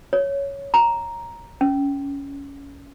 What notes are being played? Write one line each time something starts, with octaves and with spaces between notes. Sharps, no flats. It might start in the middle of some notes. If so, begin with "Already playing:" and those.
C#5
A#5
C#4